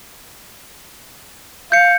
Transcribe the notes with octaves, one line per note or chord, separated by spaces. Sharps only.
F5 G6 C#7